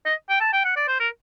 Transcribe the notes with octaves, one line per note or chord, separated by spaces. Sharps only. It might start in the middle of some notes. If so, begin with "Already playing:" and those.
D#5
G5
A5
G5
F#5
D5
C5
A#4